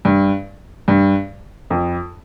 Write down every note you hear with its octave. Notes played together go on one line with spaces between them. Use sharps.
G2
G2
F2